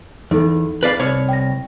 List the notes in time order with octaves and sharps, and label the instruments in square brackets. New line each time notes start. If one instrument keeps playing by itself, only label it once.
[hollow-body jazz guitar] E2 [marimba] D#4 A4
[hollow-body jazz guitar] B4 D5 F5
C2 C#5
[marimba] G5 A#6